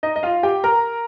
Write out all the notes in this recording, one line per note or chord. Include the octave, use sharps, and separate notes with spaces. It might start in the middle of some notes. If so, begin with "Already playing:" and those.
D#4 D#5
D#5
F4 F5
G4 G5
A#4 A#5